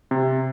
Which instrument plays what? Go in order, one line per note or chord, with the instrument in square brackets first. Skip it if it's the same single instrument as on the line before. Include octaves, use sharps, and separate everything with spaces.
[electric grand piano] C3